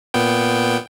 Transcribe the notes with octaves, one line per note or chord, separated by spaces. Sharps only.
A#2 B3 G5